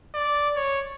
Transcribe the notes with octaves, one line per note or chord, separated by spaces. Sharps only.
D5
C#5